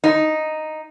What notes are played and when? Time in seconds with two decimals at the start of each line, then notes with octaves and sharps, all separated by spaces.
0.04 D#4